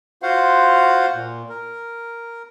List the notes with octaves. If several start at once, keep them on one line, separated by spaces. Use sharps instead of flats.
F4 F#4 C5 F5 F#5
A#2
A#4